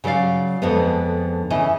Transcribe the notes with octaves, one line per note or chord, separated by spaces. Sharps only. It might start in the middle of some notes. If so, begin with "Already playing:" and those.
C#3 F#3 B4 D5 F5
F2 D3 G#3 B3
C#3 E3 D#5